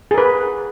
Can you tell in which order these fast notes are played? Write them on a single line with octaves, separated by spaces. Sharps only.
G#4 A#4 B4